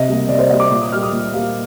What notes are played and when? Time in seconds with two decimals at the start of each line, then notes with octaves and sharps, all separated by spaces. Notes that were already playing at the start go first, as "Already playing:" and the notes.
Already playing: C3 D#5
0.08 G3 A#3
0.28 C3 D5
0.39 C5
0.50 A#3 D#5
0.53 G3
0.60 D6
0.71 A#2 D6
0.81 D#6
0.92 G3 A#3 F6
1.02 D#6
1.12 A#2
1.34 G3 A#3 F5